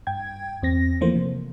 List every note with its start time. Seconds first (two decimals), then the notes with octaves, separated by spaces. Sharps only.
0.07 G2 G5 G#6
0.62 E2 C4 A#6
1.01 E3 F3 A3 A#3 C5
1.16 C3